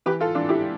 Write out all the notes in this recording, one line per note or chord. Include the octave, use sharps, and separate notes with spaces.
E3 G4 B4
F4 A4
E3 D4 F4
E4 G4